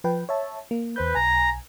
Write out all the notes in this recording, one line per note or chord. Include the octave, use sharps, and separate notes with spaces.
F3 B4 G5
C#5 E5 A5
A#3
E2 B4 C5 G6
B1 G#5 A#5